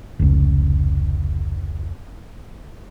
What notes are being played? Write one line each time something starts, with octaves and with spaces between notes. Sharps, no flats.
F1 C#2